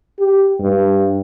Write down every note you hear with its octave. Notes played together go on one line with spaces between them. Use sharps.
G4
G2